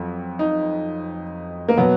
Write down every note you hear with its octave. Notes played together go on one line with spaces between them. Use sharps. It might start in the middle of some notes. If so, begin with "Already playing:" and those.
Already playing: F2 F#3
D#4
A#3
B2 F#3 B3